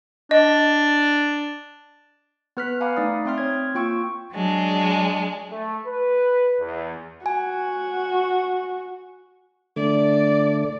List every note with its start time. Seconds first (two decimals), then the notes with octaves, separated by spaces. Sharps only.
0.31 D4 D#5
2.57 B3 B4 F6 F#6 B6
2.81 F5 F#5 G#5 A#5 B5 D6
2.97 A3 D#4 D5 D#6
3.25 C4 E5 G5 C6 D#6 F6
3.38 C4 C#5 G#6
3.74 A#3 F4 G5 C#6 E6
4.33 F#3 G#3 D4
5.52 A3
5.86 B4
6.60 E2
7.26 F#4 G#5
9.76 D3 A3 D5